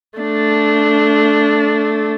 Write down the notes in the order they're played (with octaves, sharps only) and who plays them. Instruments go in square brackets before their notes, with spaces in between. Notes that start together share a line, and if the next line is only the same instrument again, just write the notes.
[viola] A3 D4